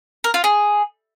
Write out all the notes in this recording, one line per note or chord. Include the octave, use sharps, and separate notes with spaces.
A#4
F4
G#4